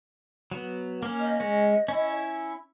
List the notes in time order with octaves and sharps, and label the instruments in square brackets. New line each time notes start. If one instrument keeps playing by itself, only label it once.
[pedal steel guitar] F#3 B3
A#3 C#4
[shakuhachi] D#5
[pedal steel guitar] G#3 C#4
C#4 E4